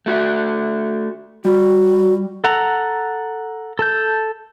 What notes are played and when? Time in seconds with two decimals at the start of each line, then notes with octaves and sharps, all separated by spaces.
0.06 A3 F#4 E5
1.45 G3 F#4
2.44 A4 F#5 A#5
3.79 A4 A5 G6